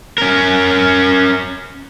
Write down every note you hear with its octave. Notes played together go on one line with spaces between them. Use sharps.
C#4 A#4